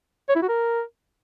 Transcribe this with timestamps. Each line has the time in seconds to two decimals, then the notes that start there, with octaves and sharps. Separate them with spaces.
0.29 C#5
0.36 E4
0.42 F#4
0.49 A#4